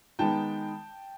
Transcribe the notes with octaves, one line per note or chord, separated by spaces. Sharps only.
D#3 G#3 B3 D#4 G5 A5